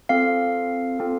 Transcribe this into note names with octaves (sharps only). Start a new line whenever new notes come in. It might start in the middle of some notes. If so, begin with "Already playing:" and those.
C4 F4 A4 F5
C4 F4 A4